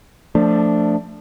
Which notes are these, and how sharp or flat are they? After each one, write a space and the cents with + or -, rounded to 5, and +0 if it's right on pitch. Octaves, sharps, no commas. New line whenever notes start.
F3 +0 A3 +25 D4 +0